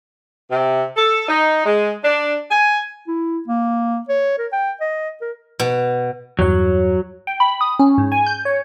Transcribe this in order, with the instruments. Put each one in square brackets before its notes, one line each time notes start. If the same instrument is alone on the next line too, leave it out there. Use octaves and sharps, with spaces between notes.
[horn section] C3
A4
D#4
G#3
D4
G#5
[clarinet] E4
A#3
C#5
A#4
G5
D#5
A#4
[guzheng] B2
[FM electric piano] E2 G2 C#5 [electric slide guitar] F#3
[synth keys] G5
B5
D#6
C#4
G#2
G#5
G6
C#5